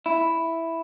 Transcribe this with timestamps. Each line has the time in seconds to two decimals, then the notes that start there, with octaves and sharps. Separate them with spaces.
0.06 E4